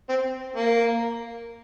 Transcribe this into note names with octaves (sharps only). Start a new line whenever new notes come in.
C4
A#3